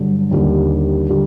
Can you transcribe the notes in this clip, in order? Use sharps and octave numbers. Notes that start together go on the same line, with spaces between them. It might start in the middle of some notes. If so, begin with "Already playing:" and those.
Already playing: G2 D3 F#3
D#2 D3 G3
D3 G3